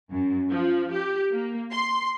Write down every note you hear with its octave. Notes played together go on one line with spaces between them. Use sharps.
F#2
F3
G4
A#3
C6